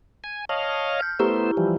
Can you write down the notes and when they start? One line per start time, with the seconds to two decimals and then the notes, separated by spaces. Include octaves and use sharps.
0.24 G#5
0.49 C#5 D#5 F5 A5
0.99 F6 G6
1.19 A3 B3 E4 G4 C5 A#5
1.57 E3 F3 G3